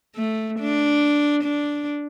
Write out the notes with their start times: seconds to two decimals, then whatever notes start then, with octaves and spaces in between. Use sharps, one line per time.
0.16 A3
0.60 D4
1.44 D4